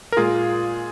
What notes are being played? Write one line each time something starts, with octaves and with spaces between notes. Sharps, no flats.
A#4
A#2 G#3 F4 G#4